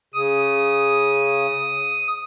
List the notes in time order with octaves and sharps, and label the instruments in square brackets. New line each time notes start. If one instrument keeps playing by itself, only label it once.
[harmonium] C#3 [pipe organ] D#6